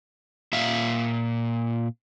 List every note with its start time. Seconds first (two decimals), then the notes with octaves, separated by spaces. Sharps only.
0.53 A#2 E5 F5